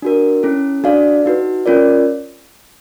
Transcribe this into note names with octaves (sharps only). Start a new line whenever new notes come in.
D4 F#4 A#4
C#4 E4 A4
D4 F#4 A4 D5 F5
D#4 F#4 B4
C#4 F4 A#4 D5